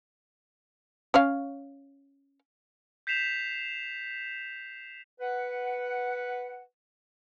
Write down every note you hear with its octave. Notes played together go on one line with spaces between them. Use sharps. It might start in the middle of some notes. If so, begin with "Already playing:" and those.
C#4 C#5 F5
G6 B6 C7 E7 F7
B4 F#5